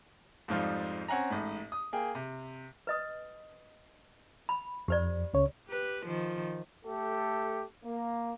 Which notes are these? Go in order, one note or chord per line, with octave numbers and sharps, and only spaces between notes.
F2 G#2 F3 G3
C4 C#4 F#5 G#5 A#5
A1 G#2
D#6
A#3 G#4 G5
C3
B4 D#5 D#6
B5
F2 G4 C5 D5
C#2 C#3 C#5
G4 B4
D#3 F3 F4
A3 G4 A4
A#3